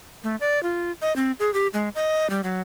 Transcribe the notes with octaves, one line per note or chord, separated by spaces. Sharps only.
A3
D5
F4
D#5
C4
G#4
G4
G#3
D#5
G3
F#3